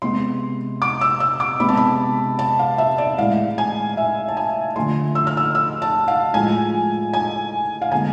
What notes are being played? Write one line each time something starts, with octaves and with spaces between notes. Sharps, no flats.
C3 G#3 B3 C6
D6
E6
E6
D6
C3 G#3 B3 B5
A5
B5
A5
F5
E5
D5
A2 E3 G#3 F5
G#5
E5
A5
G#5
D3 F3 A3 C6
E6
F6
E6
E6
A5
F5
A2 F3 G#3 G#5
G#5
F5
D3 G#3 B3 G#5